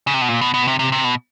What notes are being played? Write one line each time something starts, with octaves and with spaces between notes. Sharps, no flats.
C#3
C3
B2
A#2
B2
B2
C3
C3
C3
B2